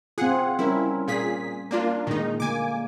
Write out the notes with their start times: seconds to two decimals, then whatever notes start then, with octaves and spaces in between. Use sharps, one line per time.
0.18 C4 F4 G#4 F#5
0.59 G3 C#4 E4 A#4
1.08 A#2 G#4 B6
1.71 A#3 D4 F4
2.07 A#2 D#3 G#3 D#4
2.40 D3 A#3 G#5 D6